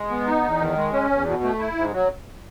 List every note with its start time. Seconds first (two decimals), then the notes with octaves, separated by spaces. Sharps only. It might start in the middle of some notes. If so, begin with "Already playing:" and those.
Already playing: G#3
0.10 B3
0.26 D#4
0.44 E2
0.60 D#3
0.76 G#3
0.93 C#4
1.10 E2
1.26 B2
1.43 A3
1.59 E4
1.76 G#2
1.92 F#3